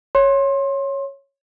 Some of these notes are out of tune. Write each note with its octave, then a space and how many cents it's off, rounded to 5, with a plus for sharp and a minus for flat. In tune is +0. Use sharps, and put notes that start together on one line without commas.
C#5 -5 C6 +25